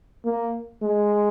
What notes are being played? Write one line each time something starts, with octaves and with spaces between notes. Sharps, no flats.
A#3
G#3